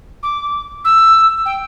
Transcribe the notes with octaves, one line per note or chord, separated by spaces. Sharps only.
D6
E6
G5